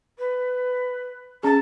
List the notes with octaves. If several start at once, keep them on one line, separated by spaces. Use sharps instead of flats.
B4
C#4 G#4 A5